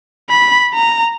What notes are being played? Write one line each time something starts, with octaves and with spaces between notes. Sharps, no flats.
B5
A#5